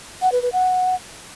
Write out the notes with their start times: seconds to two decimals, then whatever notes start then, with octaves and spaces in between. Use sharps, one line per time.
0.22 F#5
0.32 B4
0.42 B4
0.53 F#5